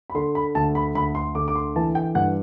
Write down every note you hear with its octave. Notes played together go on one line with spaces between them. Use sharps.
B5
D3 C6
B5
D2 A5
B5
D2 B5
C6
D3 D6
D6
C6
E3 A5
G5
G2 F#5